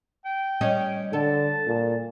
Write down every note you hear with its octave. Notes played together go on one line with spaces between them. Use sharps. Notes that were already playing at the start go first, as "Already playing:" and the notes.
G5
G3 C#4 D#5
D3 A4 A5
A#2